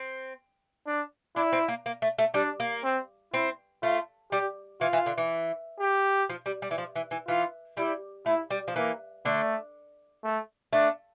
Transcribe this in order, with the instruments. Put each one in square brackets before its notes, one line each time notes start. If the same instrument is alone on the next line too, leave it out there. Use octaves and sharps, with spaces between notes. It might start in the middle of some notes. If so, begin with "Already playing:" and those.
Already playing: [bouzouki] C4
[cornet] D4
[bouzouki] D4 [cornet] E4
[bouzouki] C4
A#3
A#3
A3
A3
[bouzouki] G3 [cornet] D4
[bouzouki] A#3
[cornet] C4
[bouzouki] C4 [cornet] E4
[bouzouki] A3 [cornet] F4
[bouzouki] G3 [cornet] G4
[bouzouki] E3 [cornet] F4
[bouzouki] E3
D3
E3
[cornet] G4
[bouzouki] F3
G3
G3
E3
F3
E3
E3
[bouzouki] E3 [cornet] F4
[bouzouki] G3 [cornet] E4
[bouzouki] A3 [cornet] E4
[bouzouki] G3
F3
[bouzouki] E3 [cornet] A#3
[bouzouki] D3 [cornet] A3
[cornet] A3
[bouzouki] A3 [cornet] D4